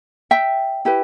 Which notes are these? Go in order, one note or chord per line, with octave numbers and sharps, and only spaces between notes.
E5 G5
E4 G4 B4